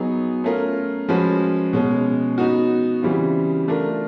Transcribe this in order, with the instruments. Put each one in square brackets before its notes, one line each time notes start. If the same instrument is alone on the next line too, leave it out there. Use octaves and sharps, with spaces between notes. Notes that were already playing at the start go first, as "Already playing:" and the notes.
Already playing: [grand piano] F#3 B3 D#4 G#4
A3 C#4 F4 A#4
F3 G#3 C#4 F#4 B4
B2 G#3 C#4
B3 D#4 F#4
C#3 E3 G3 C4 F4
A3 D4 F4 A#4